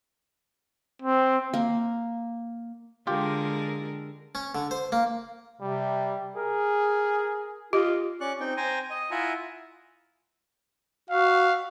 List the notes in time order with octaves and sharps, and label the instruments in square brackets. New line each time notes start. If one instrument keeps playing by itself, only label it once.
[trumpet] C4
[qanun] A#3
[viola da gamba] D3 G#3 A#4 [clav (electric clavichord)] F4 G4
[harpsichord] C#4
D3
C5
A#3
[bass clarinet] C3 [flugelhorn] G3
[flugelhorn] G#4 [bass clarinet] A#4
[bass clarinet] F4 [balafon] G4 [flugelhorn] D#5
[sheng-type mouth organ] C#4 D5 C#6 F#6
C4 D#4 G5
C5 G5 G#5 A#5
D#5 D#6
E4 F4 E5 F#5 G#5 A#5
[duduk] F#4 [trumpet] F5